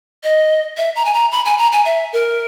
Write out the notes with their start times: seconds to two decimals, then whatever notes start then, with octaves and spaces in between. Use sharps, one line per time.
0.24 D#5
0.77 E5
0.96 A#5
1.05 G#5
1.14 A#5
1.32 B5
1.45 G#5
1.58 A#5
1.72 G#5
1.85 E5
2.13 A#4